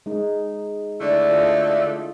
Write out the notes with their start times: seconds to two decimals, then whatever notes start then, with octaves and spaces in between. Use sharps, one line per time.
0.06 G#3 D#4
1.01 D3 A3 E4 D5
1.30 F4 A4 D#5